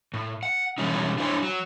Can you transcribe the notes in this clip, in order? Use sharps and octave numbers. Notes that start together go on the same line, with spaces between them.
A2
F#5
B2 E3 G3 C#4 D#4
D4 E4 C5 C#5 G#5
F#3